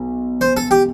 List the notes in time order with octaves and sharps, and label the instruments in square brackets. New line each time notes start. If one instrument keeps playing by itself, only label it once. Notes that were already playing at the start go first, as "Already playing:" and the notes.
Already playing: [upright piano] B1
[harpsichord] C5
A4
G4